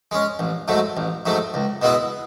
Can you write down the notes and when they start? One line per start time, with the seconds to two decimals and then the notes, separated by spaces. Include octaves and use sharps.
0.11 G#3 C#4
0.39 A1
0.68 G#2 F#3 A3
0.97 A1
1.26 G#2 F#3 A3
1.54 C#2
1.82 B2 G#3 B3 E4